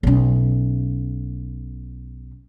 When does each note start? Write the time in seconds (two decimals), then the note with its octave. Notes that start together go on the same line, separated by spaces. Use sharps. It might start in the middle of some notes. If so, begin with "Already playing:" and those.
0.03 B1 C#4